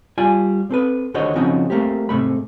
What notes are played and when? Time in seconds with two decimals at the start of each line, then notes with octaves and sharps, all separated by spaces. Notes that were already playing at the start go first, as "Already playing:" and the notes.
0.18 G3 F4 D5 G#5
0.71 C4 A4 B4
1.14 D#2 D3 F#4 C5 C#5 D#5
1.36 C#3 F3 C4 C#4 D#4 F#4
1.70 A3 A#3 C4 G4
2.09 G#2 C3 A3 B5